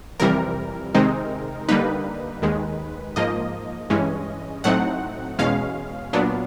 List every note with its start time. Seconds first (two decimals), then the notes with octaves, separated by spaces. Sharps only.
0.20 F2 C3 E3 G3 A#4
0.95 C3 D#3 G#3 C4 D#4
1.68 D3 G3 A#3 D#4 B4
2.42 D#2 D#3 G#3
3.16 G#2 F3 A#3 D#5
3.90 G2 E3 G#3 C#4
4.64 A2 F#3 A3 C4 D#4 F#5
5.39 E2 B2 G#3 C#4 F5
6.13 A#2 F#3 B3 D4